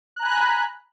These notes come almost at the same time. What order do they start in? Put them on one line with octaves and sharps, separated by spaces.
F#6 A#5 G#5 B5